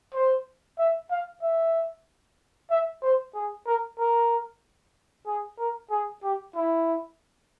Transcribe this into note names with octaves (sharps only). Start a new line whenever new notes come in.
C5
E5
F5
E5
E5
C5
G#4
A#4
A#4
G#4
A#4
G#4
G4
E4